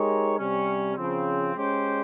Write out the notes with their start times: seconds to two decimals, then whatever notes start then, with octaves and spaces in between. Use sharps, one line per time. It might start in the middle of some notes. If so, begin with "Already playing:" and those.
Already playing: G#3 D#4 G4 A#4 C#5
0.38 C3 G3 C#4
0.96 C#3 F3 C4
1.54 G#3 C#4 G4 C5